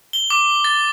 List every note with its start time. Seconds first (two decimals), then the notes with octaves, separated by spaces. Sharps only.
0.13 G7
0.30 D6
0.64 A6